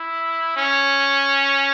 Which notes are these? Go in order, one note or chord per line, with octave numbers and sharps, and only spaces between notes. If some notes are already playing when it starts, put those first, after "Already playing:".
Already playing: E4
C#4